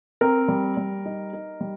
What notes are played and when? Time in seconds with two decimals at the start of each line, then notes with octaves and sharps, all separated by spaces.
0.21 C4 A#4
0.48 G3
0.77 G3
1.06 D#4
1.33 D#4
1.61 G3